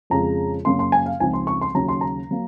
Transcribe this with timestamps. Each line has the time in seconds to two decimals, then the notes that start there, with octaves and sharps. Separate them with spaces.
0.10 F2 C#3 G#3 C#4 F4 A#5
0.65 F#2 C#3 F#3 A#3 C#4 C6
0.79 C6
0.92 G#5
1.06 F5
1.20 C#2 C#3 F3 C4 D#4 G#5
1.33 C6
1.47 C#6
1.61 C6
1.75 D#2 C#3 F#3 A#5
1.88 C6
2.01 A#5
2.31 F#3 A#3